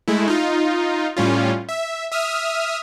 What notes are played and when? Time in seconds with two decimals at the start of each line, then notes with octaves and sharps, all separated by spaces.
0.08 G#3 A3 E4
0.28 D#4 F4
1.17 A2 G3 C#4 F4
1.69 E5
2.12 E5 D#6 F6